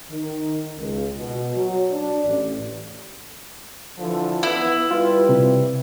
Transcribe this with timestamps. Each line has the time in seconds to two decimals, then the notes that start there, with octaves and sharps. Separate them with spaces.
0.11 D#3
0.78 C#2
1.18 B2
1.56 F#3
1.91 D4
2.25 A1
3.98 D3 E3 F3
4.43 B3 E4
4.91 G3 F4 B4
5.29 C3